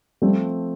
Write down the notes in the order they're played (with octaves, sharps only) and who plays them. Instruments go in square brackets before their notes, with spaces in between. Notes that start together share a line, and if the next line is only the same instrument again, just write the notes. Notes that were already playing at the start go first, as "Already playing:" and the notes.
[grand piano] F3 A3 C4 [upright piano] G3